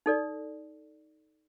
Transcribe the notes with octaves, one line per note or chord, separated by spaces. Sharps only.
D#4 A4 D5